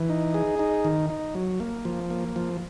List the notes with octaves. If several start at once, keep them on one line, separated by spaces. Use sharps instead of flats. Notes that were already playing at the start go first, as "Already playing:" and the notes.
Already playing: E3
D#4
G#4
D#4
D#3
D#4
F#3
A#3
F3
A#3
F3